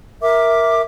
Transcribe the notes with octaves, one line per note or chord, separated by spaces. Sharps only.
A#4 E5 D6